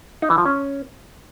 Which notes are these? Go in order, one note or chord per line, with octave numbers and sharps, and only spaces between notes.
D#4
E3
F3
C#4